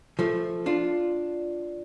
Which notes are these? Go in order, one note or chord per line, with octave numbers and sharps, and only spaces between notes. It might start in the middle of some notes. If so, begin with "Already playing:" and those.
F3 A3
D4 F4